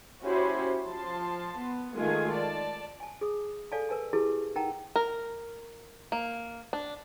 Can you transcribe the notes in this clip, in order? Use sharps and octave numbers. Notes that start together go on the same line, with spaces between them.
C#4 E4 F#4 G4 C5
F3 A5 C6
B3
D#3 G#3 A3 F4 G#4 G#5
D5 A5
G#5 A5
G#4 D#6
A4 D5 F5 G#5 A5
A#4 B4 G#5 A5
E4 G4 G#4 B4 A5
D#4 A#4 F#5 G5 A5 A#5
A#4
A#3
D4